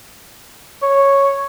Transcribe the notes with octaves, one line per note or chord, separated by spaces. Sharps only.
C#5